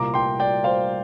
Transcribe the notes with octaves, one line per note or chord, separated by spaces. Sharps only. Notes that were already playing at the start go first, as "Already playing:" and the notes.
Already playing: C2 A#2 A#3 A#5 D6
G5 C6
D5 G5
C5 F5